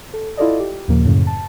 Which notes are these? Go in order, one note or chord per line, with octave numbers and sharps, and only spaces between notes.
A4
E4 F4 A4 D5 D#5
G4
D#2 A#2 C#3 F3 A#3
F#2 A2 C#3
A5